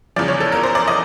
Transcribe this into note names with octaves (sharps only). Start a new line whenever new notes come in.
E2 C#3 F3 D5
C#5
A4
A#4
C5
D5
D#5